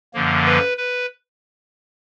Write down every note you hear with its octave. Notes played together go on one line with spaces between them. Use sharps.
F#2 D3 F3 A#3
B4
B4